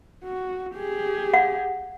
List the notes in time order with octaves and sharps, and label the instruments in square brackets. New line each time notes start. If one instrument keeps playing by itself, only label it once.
[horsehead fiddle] F#4
G4 G#4
[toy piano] F5 F#5